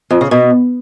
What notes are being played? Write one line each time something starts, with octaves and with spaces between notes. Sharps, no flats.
F2
C#3
B2